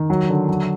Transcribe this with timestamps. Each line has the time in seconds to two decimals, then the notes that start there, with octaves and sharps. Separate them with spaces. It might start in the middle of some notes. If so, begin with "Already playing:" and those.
Already playing: D#3
0.10 F#3
0.29 D3
0.49 F#3